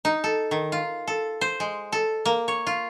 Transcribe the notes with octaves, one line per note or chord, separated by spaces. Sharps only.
D#4
A4
D#3
F4
A4
C5
G#3
A4
A#3
C#5
F4